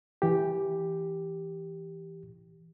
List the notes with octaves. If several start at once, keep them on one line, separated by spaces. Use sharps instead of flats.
E3 G4